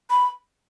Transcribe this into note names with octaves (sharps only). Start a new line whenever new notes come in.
B5